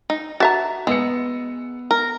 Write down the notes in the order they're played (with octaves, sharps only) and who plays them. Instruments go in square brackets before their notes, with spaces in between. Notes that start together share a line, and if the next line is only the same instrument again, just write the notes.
[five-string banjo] D#4
[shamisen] F#4 E5 A#5 [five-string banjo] A5
[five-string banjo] G#3 [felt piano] B3 E6 C#7
[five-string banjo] A#4